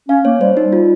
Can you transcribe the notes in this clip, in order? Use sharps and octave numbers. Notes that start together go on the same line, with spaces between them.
C#4 F5
A#3 C#5
G3 C5
G3 D#4
F4